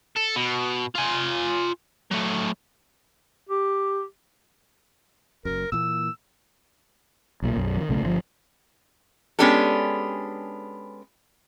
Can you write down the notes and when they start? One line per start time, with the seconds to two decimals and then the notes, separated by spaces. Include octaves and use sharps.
0.16 A4
0.36 B2
0.95 F4 G#5
2.11 F#3 A3
3.49 G4
5.45 F#1 F#2 A#4
5.72 A#2 E3 A#3 E6
7.42 B1 A#2
7.57 B1 F#2
7.77 D#3 F3
7.89 B1 C#3 A3
8.02 G1 C3 F3
9.39 G#3 B3 C#4 D4 G4 A4